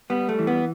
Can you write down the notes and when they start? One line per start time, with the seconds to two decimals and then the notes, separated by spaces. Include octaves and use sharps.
0.10 G3 B3
0.29 A3
0.39 E3
0.47 B3